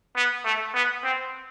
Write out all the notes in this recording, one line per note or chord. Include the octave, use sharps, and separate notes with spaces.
B3
A3
B3
C4